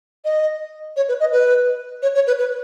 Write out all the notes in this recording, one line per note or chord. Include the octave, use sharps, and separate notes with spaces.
D#5
C#5
B4
D#5
B4
C#5
C#5
B4
B4